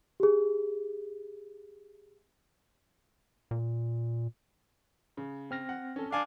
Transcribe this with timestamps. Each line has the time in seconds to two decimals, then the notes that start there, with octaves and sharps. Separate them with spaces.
0.20 G4 G#4
3.51 A#2
5.17 C#3
5.51 C4 F6 A#6
5.69 F#5
5.96 C#4 A4
6.12 D4 F5 G#5